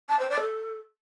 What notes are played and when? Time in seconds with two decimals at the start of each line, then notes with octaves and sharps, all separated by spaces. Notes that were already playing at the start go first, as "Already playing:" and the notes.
0.09 A5
0.19 C5
0.30 D5
0.40 A4